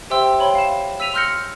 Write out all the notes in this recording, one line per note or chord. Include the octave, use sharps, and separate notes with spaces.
G4 C5 E5 G5 C6 E6
C#5 G5 B5 C6
F5 E7
E6 B6 D#7 F7
C6 E6 F6 G6 A#6 C#7